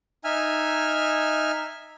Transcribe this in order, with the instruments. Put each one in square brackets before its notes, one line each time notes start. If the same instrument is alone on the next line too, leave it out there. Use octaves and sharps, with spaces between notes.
[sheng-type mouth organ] D#4 E5 G#5 F6